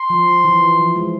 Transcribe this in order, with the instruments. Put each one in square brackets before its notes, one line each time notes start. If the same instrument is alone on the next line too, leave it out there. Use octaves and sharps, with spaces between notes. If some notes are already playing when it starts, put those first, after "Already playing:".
Already playing: [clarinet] C6
[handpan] F3
E3
F3
G#3